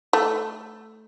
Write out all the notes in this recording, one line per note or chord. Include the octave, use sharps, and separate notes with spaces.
A3